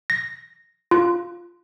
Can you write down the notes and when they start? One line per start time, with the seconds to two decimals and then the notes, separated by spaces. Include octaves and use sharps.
0.10 A#6
0.91 F4